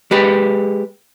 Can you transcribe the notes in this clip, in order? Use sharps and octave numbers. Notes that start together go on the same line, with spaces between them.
G#3 G4 B4